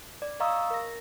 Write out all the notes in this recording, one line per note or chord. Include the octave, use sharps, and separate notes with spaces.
D5
D#5 F5 A#5 C#6 D#6 E6
A#4 A#6